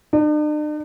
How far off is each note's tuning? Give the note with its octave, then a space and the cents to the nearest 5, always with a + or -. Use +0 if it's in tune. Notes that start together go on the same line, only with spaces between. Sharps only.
D4 +45